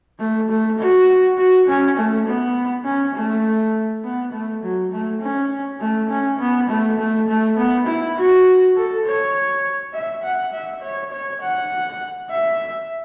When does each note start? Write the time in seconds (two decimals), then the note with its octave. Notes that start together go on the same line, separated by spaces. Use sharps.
0.19 A3
0.49 A3
0.78 F#4
1.38 F#4
1.68 C#4
1.97 A3
2.26 B3
2.85 C#4
3.15 A3
4.04 B3
4.33 A3
4.63 F#3
4.92 A3
5.21 C#4
5.81 A3
6.10 C#4
6.39 B3
6.69 A3
6.98 A3
7.28 A3
7.57 B3
7.87 E4
8.17 F#4
8.76 A4
9.06 C#5
9.94 E5
10.23 F#5
10.53 E5
10.83 C#5
11.12 C#5
11.41 F#5
12.30 E5